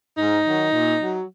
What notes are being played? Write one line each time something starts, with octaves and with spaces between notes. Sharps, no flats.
G#2 D#4
D#3 F#3
A#2
F#3